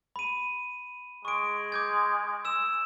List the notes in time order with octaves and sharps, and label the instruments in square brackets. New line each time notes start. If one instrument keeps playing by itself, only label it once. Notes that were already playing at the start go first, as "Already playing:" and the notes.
[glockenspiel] B5 D#7
[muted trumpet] G#3 [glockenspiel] C#6 D7
[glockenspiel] D6 G6 G#6
E6 E7